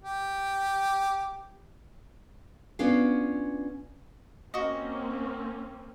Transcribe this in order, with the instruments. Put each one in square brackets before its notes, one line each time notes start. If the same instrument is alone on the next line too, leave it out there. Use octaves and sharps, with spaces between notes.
[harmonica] G4
[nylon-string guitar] B3 C#4 D4 F4 F5
[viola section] A#3 C4 C#4 [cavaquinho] F#4 D#5